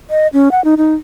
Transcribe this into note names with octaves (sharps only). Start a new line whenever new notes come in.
D#5
C#4
F#5
D#4
D#4